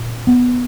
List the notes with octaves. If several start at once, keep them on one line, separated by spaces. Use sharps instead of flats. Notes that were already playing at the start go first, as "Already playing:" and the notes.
Already playing: A#2
B3